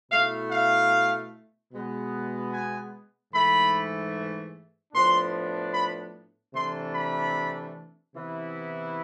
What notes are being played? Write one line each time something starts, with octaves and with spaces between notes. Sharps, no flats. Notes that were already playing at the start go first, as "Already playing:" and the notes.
B2 A3 E4 F5
F5
B2 G#3 B3
G#5
G#2 E3 A3 B5
A2 F3 B3 D4 C6
B5
C3 E3 A3 D4 C6
B5
C3 E3 B3 E4